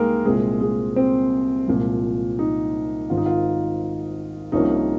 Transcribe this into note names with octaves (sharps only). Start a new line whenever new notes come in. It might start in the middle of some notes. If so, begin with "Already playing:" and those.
Already playing: C2 G#3 A#3 D#4 G#4 A#4 G5
C2 A#2 G#3 C4 G#4
G#3 G#4
C4 C5
C2 A#2 F3 G#3
D#4
G#1 G#2 D#3 F4
D#4
F4
C2 C3 F3 A#3 C#4 D#4